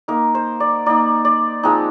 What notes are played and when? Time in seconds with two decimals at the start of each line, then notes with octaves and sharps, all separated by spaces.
0.08 A#3 D#4 A#4
0.35 C5
0.60 D5
0.86 A#3 D#4 D5
1.25 D5
1.63 F3 G#3 C4 D#4